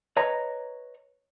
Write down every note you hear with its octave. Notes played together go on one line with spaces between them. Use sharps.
B4 C#5 D#5 A#5